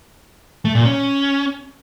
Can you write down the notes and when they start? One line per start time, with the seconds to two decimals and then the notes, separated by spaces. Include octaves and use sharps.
0.65 A3
0.75 A#2
0.85 C#4